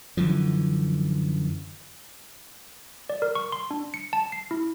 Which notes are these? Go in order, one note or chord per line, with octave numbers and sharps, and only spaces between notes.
F#2 D3 E3 F3
D5
A#4
C#6
C6
D4
C#7
A5
C7
E4